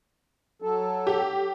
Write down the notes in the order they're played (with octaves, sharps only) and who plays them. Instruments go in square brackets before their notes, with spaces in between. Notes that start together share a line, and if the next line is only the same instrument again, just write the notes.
[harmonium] F#3 A4
[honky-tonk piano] G4